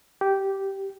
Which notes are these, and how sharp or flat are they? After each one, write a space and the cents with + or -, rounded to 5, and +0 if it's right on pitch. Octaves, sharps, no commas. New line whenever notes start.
G4 -10